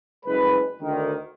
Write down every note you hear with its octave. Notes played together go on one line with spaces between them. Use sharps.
F#1 G#3 B4
D2 D#3